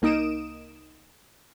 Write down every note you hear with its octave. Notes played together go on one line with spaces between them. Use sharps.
C2 A#3 D#4 D#6 D7 E7